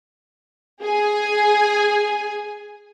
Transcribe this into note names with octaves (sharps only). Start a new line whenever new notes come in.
G#4 G#5